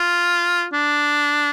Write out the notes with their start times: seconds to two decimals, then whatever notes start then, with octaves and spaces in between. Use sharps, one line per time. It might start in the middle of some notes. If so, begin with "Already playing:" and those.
Already playing: F4
0.73 D4